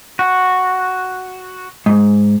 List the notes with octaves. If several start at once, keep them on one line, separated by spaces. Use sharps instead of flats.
F#4
G#2